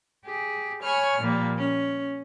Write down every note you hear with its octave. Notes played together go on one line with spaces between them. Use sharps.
G4 G#4
C#5 G#5 B5 C#6 F6
A#2 F3 G3 A#3
C#4